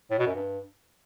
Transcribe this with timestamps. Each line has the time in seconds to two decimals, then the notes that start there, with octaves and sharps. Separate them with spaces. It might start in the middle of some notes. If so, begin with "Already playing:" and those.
0.10 A2
0.19 B2
0.27 F#2
0.35 G2